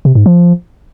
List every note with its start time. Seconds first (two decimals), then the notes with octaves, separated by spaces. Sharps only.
0.05 C3
0.15 G#2
0.26 F3